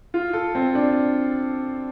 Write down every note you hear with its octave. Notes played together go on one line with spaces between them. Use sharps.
F4
A4
C4
D4